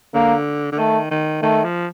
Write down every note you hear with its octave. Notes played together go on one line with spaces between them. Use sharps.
D3 A#3
D3
D#3 A3
D#3
D#3 A3
F3